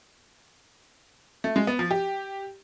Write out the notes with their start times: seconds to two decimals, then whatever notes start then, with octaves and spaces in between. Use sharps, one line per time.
1.44 A3
1.56 G#3
1.67 B3
1.79 F3
1.91 G4